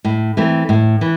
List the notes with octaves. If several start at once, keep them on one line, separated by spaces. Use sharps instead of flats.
A2
E3 A3 C4
A2
E3